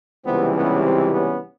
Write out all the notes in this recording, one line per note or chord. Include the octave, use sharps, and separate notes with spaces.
C#2 C3 E3 G3 B3 C4
B3 C#4
C4
B3 C#4